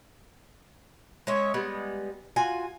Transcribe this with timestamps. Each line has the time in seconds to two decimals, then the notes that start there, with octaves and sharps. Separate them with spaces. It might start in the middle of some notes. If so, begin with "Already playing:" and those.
1.27 G#3 C#4 C#5 E5
1.54 G3 G#3 B3
2.36 F4 F#4 G#5